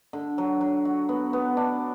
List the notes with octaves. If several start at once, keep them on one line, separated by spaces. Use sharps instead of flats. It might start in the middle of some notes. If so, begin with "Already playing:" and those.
D3
F#3
F#3
F#4
B3
B3
D4